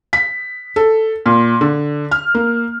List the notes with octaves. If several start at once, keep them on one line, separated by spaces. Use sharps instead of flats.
B6
A4
A#2
D3
F6
A#3